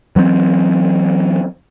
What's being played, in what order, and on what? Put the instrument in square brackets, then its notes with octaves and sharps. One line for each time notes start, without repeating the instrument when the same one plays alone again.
[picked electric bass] E3 F#3 G#3 C4